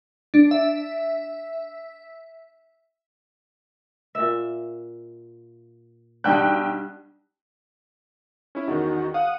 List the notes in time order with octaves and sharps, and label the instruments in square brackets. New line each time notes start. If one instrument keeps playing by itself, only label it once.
[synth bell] D4
E5
[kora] A#2 E5
[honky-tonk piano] B1 G5 F#6 [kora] G3 D4
[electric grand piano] C#4 E4
[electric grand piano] E2 D#3 [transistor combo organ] D#4 F#4
[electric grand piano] F5 [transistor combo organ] F#5 D#6